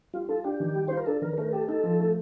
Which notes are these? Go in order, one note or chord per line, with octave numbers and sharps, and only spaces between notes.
G3 F4
F4 A4
D4 G4
D#3
G3
F4 C5
A#4
D4 A4
D#3 A#4
A3 A#4
G4 A4
D#4 A4
F3
A3